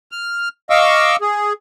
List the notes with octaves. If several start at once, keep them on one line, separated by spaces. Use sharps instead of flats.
F6
D#5 F5 C#6 D6 E6
G#4